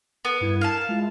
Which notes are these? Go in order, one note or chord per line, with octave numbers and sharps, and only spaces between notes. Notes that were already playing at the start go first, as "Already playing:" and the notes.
B3 A4
G2 E4 G#6
A#4 F5 A5
G#3 E4 F4